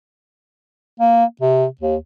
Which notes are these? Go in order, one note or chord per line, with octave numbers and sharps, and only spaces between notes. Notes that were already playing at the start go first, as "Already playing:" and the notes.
A#3
C3
D#2